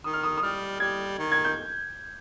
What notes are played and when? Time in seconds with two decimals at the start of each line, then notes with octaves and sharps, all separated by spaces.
0.04 D#3 D#6
0.13 F6
0.23 D#6
0.37 D#6
0.43 G3 F6
0.80 G3 G#6
1.19 D#3
1.32 G#6
1.45 G6